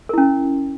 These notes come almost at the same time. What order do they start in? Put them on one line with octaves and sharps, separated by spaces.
A#4 E4 C#4